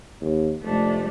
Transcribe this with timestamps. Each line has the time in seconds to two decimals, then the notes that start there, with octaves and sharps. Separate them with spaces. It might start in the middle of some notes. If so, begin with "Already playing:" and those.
0.21 D#2
0.62 F1 A3 D4